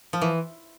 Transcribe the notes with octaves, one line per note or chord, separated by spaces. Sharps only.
F3
E3